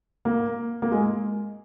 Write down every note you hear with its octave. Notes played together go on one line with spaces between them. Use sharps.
A#3
A#3
G#3